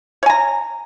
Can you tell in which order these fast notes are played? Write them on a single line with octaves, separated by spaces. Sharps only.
C#5 G#5 A#5